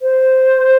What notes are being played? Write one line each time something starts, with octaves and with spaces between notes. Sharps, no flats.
C5